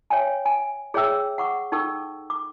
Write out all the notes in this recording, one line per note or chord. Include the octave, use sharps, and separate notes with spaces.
C#5 E5 G5 G#5
G#5
G#4 C#5 E5 G5 E6
F#5 C#6 D6
D#4 A4 G5 C#6 E6
D6